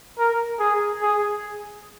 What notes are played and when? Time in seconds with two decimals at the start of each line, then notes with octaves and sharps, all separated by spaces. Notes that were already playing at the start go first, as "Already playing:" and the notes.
0.18 A#4
0.59 G#4
1.02 G#4